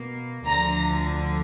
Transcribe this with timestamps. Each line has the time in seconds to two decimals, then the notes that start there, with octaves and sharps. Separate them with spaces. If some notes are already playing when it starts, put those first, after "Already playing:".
Already playing: B2 A#3
0.47 D2 D3 F3 A#5